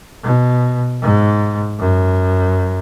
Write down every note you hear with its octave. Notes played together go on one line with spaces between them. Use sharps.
B2
G#2
F#2